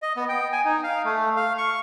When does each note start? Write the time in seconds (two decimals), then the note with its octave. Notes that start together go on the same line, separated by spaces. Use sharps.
0.02 D#5
0.16 B3
0.29 G5
0.52 G#5
0.65 D#4
0.83 F5
1.05 A3
1.36 F5
1.58 C#6